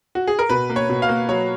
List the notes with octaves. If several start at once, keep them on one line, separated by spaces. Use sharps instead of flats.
F#4
G#4
A#4
B2 B4
A#3
C#5
B2
F5
A#3
F#3 C#5